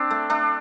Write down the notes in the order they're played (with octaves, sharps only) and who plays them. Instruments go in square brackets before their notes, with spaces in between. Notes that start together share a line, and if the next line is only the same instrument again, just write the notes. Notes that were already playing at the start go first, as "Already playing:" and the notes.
Already playing: [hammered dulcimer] C4 D4
A3
A3 D4